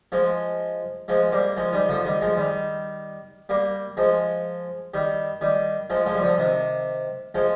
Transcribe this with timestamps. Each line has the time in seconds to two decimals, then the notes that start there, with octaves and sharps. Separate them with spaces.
0.12 F3 G#3
1.08 F3 G#3
1.32 G3 A#3
1.57 F3 G#3
1.72 D#3 G3
1.89 D3 F3
2.05 D#3 G3
2.21 F3 G#3
2.37 D#3 G3
3.49 G3 A#3
3.97 F3 G#3
4.94 D#3 G3
5.41 D#3 G3
5.90 F3 G#3
6.06 F3 G#3
6.14 G3
6.22 D3 F3
6.38 C3 D#3
7.35 F3 G#3